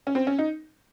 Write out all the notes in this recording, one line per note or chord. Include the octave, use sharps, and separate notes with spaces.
C#4
C4
C#4
D#4